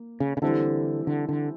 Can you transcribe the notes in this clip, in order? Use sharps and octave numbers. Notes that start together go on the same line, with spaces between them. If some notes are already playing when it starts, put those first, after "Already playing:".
Already playing: A#3
C#3
C#3
D3 E3 G3 C4 E4 A4
D3
D3